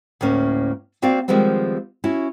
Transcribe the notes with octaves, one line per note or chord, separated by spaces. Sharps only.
D2 A2 A#3 C#4
A#3 C4 F#4 D5 F5
D#3 F3 G3 G#3 B3 C4
C#4 E4 F#4